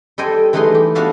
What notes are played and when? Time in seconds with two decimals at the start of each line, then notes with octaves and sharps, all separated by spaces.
0.18 G3 A4 C5 D#5 G5 G#5
0.53 E3 G#3 A3 D#4 B4 C6
0.75 G4
0.95 B3 D4 F#4 E5 F5 A5